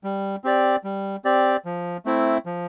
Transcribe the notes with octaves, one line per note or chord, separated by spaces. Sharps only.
G3
C4 G4 D5
G3
C4 G4 D5
F3
A3 C4 E4
F3